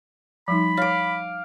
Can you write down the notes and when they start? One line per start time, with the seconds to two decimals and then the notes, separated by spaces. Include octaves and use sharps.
0.48 F3 G3 D#4 B5
0.77 C#5 F5 D6